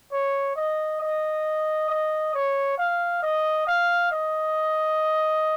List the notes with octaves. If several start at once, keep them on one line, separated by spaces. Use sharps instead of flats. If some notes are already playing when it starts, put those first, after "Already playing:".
C#5
D#5
D#5
D#5
C#5
F5
D#5
F5
D#5